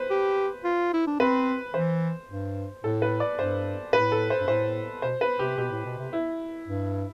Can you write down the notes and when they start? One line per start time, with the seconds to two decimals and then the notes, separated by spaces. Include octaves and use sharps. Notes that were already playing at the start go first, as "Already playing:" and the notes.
Already playing: B4 C5
0.10 G4
0.64 F4
0.94 E4
1.07 D4
1.20 C4 B4
1.74 E3 C5
2.30 G2
2.84 A2 A4
3.02 B4
3.20 D5
3.39 G2 C5
3.93 A2 B4
4.12 A4
4.30 C5
4.41 G2
4.48 A2 C5
5.02 B2 C5
5.21 B4
5.39 C3 G4
5.57 B2 G4
5.72 A2
5.85 B2
5.99 C3
6.13 E4
6.68 G2